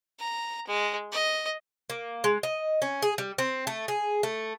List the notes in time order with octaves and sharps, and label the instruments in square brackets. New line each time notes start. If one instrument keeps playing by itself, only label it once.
[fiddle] A#5
G#3
D#5
[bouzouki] A#3
G#3
D#5
C#4
G#4
G3
C4
A3
G#4
A3